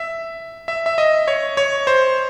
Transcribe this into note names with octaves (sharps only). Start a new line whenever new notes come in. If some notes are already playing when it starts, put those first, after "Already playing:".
Already playing: E5
E5
E5
D#5
C#5
C#5
C5